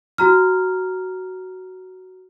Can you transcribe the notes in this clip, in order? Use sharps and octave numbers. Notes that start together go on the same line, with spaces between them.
F#4 A#5 F6